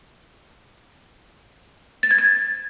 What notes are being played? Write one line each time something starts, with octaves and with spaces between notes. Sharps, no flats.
A6
G#6
A6